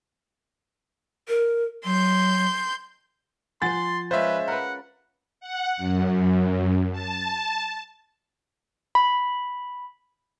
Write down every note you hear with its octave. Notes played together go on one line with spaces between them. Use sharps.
A#4
F#3 C6 G6
F3 C5 F#5 G#5 C6 A6
G#3 C#4 F4 B4 C5 E5
A#4 B4 F#5
F#5
F#2
A5
B5